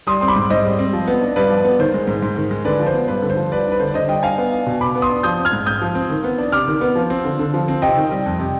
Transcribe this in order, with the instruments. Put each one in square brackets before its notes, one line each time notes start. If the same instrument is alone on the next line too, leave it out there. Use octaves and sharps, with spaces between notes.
[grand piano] G3 C6 D#6
C4 C6
B5 D6
G#2
G#2 C5 D#5
G3
C4
F3
B3
D4
G2 B4 D5
F3
B3
D#3 C5
G#3
G#2
G#2
D#3
G#3
D3 B4 D5
F3
C5
B3
G2 B4
D3
C5
F3
G3 B4 D5
D4
B4
D3 C5
D5
D3 C5 D#5
G3 D#5 G5
D4 F5 G#5
B3
D4
B2
B2 B5 D6
B3
C6 D#6
D4
F3 D#6 G6
C4
F6 G#6
G#2
G#2 D#6 G6
F3
C4
D#3
B3
D4
C3 D6 F6
D#3
B3
F3
C4
D3
D3
F3
C4
C3 D#5 G5
D#3
G3
F2
C3